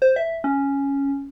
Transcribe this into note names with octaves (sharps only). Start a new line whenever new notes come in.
C5
E5
C#4